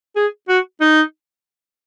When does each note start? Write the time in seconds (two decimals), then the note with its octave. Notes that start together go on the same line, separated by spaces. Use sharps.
0.16 G#4
0.49 F#4
0.81 D#4